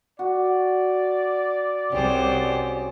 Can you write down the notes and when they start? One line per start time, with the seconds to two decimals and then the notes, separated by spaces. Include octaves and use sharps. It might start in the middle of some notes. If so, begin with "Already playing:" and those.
0.19 F#4 D5
1.92 C2 C#4 G4 G#4 C5